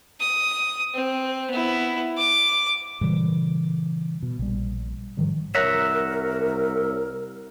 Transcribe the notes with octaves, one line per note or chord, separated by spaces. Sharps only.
D#6
C4
B3 E4
D6
A#2 C#3 E3 G3
B2
A#1 G3
G#2 D#3 F3 G3
C2 A#4 C#5 E5 F#5 A#5 F#6 A#6